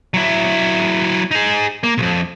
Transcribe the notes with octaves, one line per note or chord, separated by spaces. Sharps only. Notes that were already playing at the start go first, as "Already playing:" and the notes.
F#3 E4
D#4 G#4
A#3
B1 F2